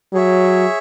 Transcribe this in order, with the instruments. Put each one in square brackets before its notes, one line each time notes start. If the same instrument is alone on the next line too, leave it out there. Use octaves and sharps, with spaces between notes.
[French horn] F#3 [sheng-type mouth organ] G#4 C#5 E5